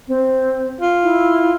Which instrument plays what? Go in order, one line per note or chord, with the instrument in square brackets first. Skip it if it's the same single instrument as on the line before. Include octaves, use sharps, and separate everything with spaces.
[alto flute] C4
[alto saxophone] F4
[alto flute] E4